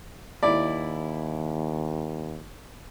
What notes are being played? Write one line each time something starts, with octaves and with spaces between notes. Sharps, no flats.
D#2 E4 D5